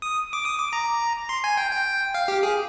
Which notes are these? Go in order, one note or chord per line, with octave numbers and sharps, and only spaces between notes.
D#6
D6
D#6
D6
A#5
C6
G#5
G5
G5
F5
G4
G#4